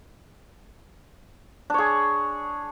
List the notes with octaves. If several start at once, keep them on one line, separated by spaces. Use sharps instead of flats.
D4 G#4 C#5